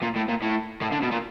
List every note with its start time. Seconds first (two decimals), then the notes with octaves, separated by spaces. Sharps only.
0.02 A#2
0.16 A2
0.28 A#2
0.42 A2
0.82 A2
0.92 D3
1.03 B2
1.12 A#2